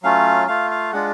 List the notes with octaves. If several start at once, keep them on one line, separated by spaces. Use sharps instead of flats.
F#3 A3 C#4 F4 F5
A3 F4 F5
F5
G#3 D4 F4 F#5